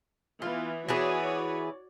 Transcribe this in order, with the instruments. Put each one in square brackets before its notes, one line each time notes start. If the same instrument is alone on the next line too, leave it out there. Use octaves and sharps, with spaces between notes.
[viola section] E3 B3 [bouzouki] F4
[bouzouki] E3 B3 G#4 [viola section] F#4 C#5 D5